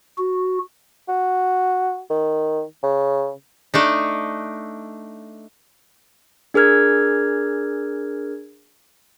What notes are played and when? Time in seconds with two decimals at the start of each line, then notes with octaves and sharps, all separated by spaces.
0.18 F#4
1.08 F#4
2.10 D#3
2.83 C#3
3.74 A3 D4 D#4
6.54 D4 G#4 A#4 F6 G#6